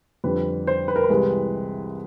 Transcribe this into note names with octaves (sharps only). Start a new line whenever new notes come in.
F2 D3 G3 B4
C5
B4
A#4
B4
C2 C3 E3 G#3